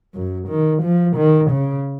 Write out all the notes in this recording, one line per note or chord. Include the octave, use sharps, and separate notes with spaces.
F#2
D#3
F3
D#3
C#3